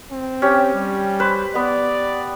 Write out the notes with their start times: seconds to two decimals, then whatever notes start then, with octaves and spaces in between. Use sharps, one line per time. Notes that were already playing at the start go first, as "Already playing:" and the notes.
0.11 C4
0.42 C#4 G4
0.74 G3
1.20 B4 C5
1.55 B3 D5